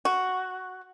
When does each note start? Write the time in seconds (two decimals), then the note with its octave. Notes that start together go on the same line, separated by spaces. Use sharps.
0.05 F#4